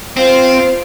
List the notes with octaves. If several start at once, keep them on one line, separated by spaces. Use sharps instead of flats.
C4 F4 C5 F5